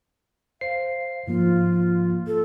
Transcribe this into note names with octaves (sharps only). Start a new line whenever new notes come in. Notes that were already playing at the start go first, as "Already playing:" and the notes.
C5 F5 C7
G#2 F3 A#3 F4
A4